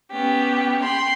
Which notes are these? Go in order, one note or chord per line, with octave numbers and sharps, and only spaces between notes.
B3 C#4 G4
G5 B5 C6